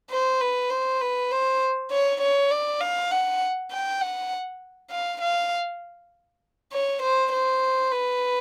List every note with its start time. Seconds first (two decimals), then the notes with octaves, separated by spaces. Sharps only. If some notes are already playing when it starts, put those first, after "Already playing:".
0.10 C5
0.40 B4
0.70 C5
1.01 B4
1.31 C5
1.91 C#5
2.21 C#5
2.51 D5
2.80 F5
3.11 F#5
3.71 G5
4.00 F#5
4.91 F5
5.21 F5
6.72 C#5
7.02 C5
7.32 C5
7.91 B4